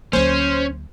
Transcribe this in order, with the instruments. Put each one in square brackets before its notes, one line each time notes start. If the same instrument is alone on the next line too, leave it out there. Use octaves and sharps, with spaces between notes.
[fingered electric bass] D2 F#3 A#3 [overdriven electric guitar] C#4 [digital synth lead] C5